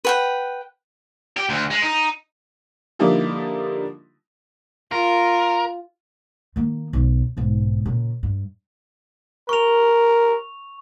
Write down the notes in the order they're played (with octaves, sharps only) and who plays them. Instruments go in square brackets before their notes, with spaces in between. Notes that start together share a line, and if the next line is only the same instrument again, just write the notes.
[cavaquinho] B4 F#5 G5
[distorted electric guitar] G4
D2
G#3
D#4
[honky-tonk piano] D3 F3 G3 A#3 D#4 E4
[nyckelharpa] F4 [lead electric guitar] A#4
[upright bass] D#3 A#3
B1 F#2
B1 G#2
A#2 C#3
G2
[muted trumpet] A#4 [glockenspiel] C#6 F7